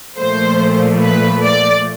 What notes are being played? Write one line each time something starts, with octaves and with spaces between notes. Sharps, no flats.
A#2 F3 A3 C5
B4
D5